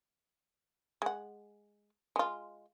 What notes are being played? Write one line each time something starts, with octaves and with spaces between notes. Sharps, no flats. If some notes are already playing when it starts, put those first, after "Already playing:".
G#3 F#5
G#3 F4